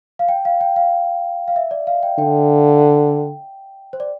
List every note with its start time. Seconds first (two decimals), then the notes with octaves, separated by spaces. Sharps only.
0.19 F5
0.29 G5
0.45 F5
0.61 G5
0.76 F5
1.48 F5
1.56 E5
1.71 D5
1.87 F5
2.03 G5
2.18 D3 G5
3.93 C5
4.00 D5